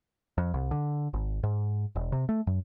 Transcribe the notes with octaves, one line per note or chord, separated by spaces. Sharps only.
F2
C2
D3
G#1
G#2
E1
C3
A3
F#2